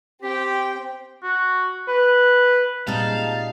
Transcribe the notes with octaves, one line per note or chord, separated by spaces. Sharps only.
C4 G4 G5
F#4
B4
A#2 G3 G#3 C4 D#4 F5 A5